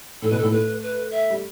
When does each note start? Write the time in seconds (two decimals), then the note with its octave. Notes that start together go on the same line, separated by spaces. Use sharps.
0.22 A2 A4
0.30 B2 B4
0.38 A2 A4
0.52 A3 B4
0.82 B4
1.11 E5
1.30 G3